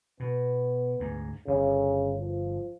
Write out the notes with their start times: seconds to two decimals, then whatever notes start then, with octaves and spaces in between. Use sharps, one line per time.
0.20 B2 B3
1.00 D2 G#2
1.47 G1 C#3
2.20 F3